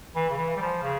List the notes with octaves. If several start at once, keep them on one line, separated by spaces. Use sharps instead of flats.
E3
C#3
E3
G3
F3
C#3